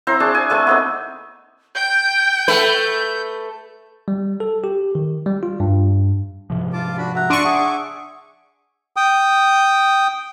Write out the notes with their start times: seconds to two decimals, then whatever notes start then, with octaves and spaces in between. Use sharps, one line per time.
0.07 C4 E4 C5 A#5
0.20 D4 G#4 A5 C#6
0.35 G#5
0.50 A3 C4 A4 G#5
0.67 B3 C4 D#4
1.75 G5 G6
2.48 A3 B4
4.08 G3
4.40 A4
4.64 G4
4.95 D#3
5.26 G3
5.43 F4
5.60 G2
6.50 G#2 C3 F3
6.73 F4 A5 D6
6.98 D4 F#4 B5
7.15 E5 F#5 A#5 F#6
7.30 D4 C6 C#6 D7 D#7
7.45 G#4 E5 F#5 D6 D#6
8.96 G5 D#6